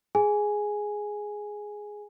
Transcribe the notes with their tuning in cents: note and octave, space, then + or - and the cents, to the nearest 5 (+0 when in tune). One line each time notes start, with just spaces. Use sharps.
G#4 +5 G#5 +0